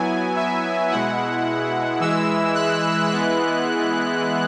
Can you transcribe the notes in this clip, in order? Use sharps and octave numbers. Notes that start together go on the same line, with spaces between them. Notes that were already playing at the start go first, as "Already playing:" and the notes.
Already playing: F#3 B3 E4 G#5
E5
B2 G#3 E4 F#5
E3 G#3 E4 E6
F#6
E3 G#3 B3 E4 F#6